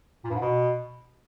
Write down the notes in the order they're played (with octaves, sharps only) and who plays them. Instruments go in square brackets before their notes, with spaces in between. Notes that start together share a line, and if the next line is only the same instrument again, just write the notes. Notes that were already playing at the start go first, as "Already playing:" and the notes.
[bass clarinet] A#2
G2
G#2
B2